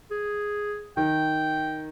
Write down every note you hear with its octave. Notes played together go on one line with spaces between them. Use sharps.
G#4
D#3 G5